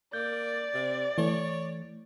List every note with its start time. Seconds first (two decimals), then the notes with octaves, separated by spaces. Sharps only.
0.13 A#3 D5 G6
0.74 C3
1.18 E3 A3 C#5